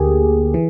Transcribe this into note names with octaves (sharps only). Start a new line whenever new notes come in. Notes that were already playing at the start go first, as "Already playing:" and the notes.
Already playing: D2 D3 A#3 G4 G#4
E3